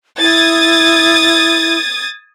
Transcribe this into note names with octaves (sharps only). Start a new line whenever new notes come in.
E4 D#6 G#6 A6